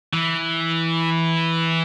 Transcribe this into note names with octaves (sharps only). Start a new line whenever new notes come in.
E3